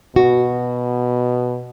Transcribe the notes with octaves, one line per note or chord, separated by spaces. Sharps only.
B2 F#4